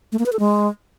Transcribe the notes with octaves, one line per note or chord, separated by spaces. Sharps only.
A3
A#3
B4
A4
G#3